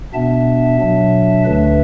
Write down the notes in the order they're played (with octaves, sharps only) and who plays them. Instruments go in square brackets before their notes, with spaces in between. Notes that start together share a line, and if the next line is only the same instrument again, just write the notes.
[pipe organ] B2 B3 D4 E5 A5
B2 F#3 D4
D2 D3 A3 D4 B4 E5